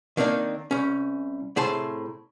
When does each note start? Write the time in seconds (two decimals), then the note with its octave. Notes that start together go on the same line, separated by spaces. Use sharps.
0.17 D#3 A#3 C4 D4 D#4
0.71 C2 C#4
1.56 A2 C3 G#4 C5 A5 C6